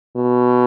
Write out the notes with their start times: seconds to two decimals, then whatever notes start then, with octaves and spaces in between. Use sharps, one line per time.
0.16 B2